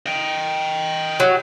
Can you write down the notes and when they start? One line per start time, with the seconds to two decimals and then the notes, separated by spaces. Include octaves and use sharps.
0.06 D#5 G5
1.20 F#3